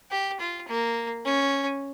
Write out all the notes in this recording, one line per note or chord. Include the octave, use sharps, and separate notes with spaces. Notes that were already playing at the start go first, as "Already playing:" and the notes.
G4
F4
A#3
C#4